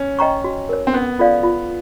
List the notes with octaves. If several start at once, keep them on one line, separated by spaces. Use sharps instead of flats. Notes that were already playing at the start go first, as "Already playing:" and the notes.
Already playing: C#4
D#5 G5 A#5 C#6
F#4
A#4 C#5
C4
B3 C#4
F4 A4 D5 F5
F4